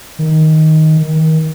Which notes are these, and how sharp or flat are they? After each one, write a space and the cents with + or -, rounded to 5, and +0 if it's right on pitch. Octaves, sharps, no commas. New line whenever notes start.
D#3 +10
D#3 +30